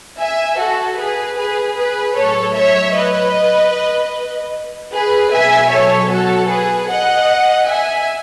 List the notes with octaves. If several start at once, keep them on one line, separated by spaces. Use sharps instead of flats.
E5 G#5
F#4 A4
G#4 B4
G#4 B4
G#4 B4
A2 F#3 A4 C#5
C#5 E5
B4 D#5
G#4 B4
B2 F#3 E5 G#5
A4 C#5
F#4 A4
G#4 B4
D#5 F#5
E5 G#5